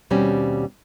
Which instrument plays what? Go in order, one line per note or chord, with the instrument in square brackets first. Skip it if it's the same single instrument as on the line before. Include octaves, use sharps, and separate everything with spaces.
[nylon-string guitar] D#2 B2 G3 C4 C#4